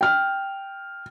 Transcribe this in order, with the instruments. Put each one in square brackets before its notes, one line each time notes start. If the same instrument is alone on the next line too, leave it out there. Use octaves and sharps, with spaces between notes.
[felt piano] G5 F6